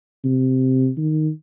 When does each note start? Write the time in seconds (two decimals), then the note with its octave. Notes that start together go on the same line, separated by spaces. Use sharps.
0.24 C3
0.97 D#3